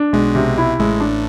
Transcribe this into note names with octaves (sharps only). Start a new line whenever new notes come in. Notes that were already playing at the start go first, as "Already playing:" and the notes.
Already playing: D4
B1 B2 G#3
C3
E4
A1 A2 G#3
D4